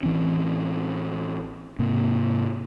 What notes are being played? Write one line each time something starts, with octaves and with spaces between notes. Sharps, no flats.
A1 E3 C4 C#4
G#2 C3 A#3